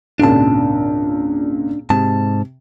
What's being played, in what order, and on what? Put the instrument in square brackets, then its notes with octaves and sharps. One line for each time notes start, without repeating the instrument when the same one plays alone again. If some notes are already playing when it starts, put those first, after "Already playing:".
[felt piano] G#1 C#2 A#2 [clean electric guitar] D4 A5
[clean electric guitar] G#2 A5 [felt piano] C3